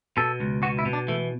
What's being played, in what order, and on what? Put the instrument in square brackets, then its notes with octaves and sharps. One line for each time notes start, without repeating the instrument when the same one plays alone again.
[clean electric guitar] B2 A4
C#2
B2 F#4
E4
B2
D4
E3 A3